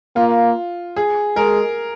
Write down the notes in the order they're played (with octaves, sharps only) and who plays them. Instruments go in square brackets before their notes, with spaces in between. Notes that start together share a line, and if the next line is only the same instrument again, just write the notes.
[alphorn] A#3 [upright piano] F4
[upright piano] G#4
[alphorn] G#3 [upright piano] A#4